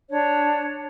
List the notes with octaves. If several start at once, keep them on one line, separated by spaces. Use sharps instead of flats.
D4 C#5